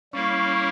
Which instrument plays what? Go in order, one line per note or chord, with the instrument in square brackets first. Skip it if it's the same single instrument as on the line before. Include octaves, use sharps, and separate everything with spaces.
[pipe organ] G3 A#3 E4 A#4 [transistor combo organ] C#4